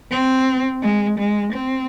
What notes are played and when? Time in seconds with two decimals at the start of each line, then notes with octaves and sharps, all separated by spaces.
0.11 C4
0.82 G#3
1.18 G#3
1.53 C4